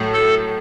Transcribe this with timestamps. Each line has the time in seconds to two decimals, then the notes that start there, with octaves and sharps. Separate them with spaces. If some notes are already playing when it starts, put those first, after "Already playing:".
Already playing: A2 F#3 A3
0.14 A4